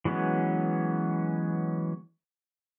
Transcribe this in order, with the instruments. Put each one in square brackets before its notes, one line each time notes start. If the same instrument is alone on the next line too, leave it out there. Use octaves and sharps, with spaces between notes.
[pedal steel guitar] E3 F#3 G#3 B3 C#4